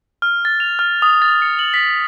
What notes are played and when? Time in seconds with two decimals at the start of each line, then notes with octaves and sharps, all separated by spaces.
0.22 F6
0.45 A6
0.60 F7
0.79 F6
1.02 D#6
1.22 A6
1.42 C#7
1.59 F#7
1.74 B6